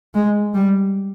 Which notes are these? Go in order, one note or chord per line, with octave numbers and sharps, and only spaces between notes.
G#3
G3